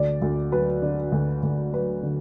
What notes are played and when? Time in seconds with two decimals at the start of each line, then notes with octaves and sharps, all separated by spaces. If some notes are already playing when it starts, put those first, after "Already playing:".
Already playing: D2 D5
0.22 D2
0.52 F#3 B4
0.82 D3
1.12 D2
1.43 D2
1.74 F#3 B4
2.03 D3